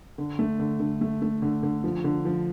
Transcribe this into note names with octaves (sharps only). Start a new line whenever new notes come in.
D3
A3
D3
D3
A3
A3
D3
D3
F3
D3
F3